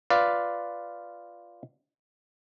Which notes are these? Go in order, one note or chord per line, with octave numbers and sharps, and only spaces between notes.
F4 B4 D5 F5